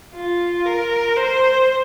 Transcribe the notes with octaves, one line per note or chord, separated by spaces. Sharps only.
F4
A#4
C5